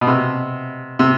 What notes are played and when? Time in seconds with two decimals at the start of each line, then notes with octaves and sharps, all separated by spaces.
0.01 B2
0.07 C3
0.99 C3